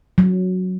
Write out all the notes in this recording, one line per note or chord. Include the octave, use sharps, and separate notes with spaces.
F#3